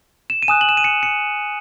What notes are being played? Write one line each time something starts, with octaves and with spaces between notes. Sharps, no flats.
E7
D#7
G#5 D#6 F#6 E7
F#7
E7
D#7
C#7
C#7